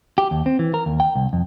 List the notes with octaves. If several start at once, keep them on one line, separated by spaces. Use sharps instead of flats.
G4
D#2
C4
E3
A#4
D#2
G5
C2
F2